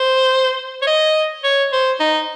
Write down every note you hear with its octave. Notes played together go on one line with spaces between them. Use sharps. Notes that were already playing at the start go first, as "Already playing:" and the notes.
Already playing: C5
C#5
D#5
C#5
C5
D#4